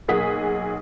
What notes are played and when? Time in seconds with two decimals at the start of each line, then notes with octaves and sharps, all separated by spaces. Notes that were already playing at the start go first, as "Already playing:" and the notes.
0.08 B1 A#3 G#4 F#5 D#6 B6